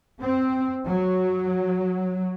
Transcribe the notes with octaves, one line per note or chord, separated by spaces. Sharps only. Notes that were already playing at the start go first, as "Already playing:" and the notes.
C4
F#3